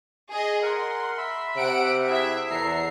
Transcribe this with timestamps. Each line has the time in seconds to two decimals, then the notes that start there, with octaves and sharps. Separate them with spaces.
0.31 G#4 D#5
0.62 A#4 F#5 C6
1.18 E5 B5
1.56 C3 F#5 D7
2.10 E4 G#4 E5 F#6
2.51 E2 A4 E5 A#5 C7